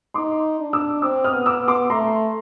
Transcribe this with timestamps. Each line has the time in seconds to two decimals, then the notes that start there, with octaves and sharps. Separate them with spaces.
0.14 D#4 C6 D6
0.59 D4
0.73 D6 E6
1.02 C4 D6 E6
1.24 D#6 F6
1.31 B3
1.46 D6 E6
1.60 B3
1.68 C6 D6
1.90 A3 A#5 C6